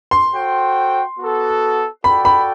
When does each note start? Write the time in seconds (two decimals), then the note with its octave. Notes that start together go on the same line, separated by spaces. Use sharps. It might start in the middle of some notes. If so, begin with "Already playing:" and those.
0.11 C6
0.32 F#4 A4 C5 G5
1.18 B3 F#4 A4
2.04 F#4 A4 D5 G5 B5
2.25 B5